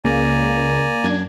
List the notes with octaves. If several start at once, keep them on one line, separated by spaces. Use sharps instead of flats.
C#2 C#3 A#3 D5 G#5 A#5
F#2 D4 G#6